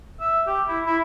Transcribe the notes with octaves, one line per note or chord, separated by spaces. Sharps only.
E5
G4
E4
E4